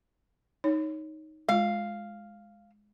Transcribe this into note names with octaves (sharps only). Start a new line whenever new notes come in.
D#4 C#5
G#3 F4 F5